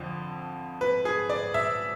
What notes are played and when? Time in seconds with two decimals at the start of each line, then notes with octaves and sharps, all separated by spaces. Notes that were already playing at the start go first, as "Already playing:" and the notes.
Already playing: F2 D3 F3
0.81 B4
1.05 G#4
1.30 D5
1.54 E5